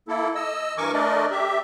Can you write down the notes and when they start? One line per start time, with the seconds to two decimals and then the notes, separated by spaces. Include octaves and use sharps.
0.08 A#3 E4 A4
0.35 D#5 E6
0.77 G2 E3 A#4 G#5 C#6 D6
0.93 A3 D4 A#4 D5 D#5
1.31 G4 E5